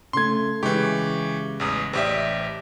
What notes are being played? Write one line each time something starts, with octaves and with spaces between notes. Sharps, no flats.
C#3 A3 C6 G#6
C#3 E3 G#3 G4 C#6
A1 E2 D#6
A1 G4 C5 D5 E5 D#6